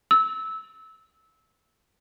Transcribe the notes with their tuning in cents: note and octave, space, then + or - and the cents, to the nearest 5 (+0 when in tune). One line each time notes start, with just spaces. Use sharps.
E6 -20